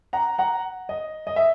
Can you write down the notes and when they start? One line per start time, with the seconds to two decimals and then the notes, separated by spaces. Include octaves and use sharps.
0.13 F#5 A#5
0.38 F#5 A#5
0.89 D#5
1.27 D#5
1.36 E5